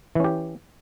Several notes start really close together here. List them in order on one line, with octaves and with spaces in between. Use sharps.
E3 C#4 G4